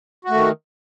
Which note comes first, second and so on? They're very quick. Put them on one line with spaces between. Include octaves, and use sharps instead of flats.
F#4 A3 D#3